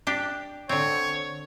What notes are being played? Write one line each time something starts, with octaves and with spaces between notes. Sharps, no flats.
D4 G4
D3 C4 C#5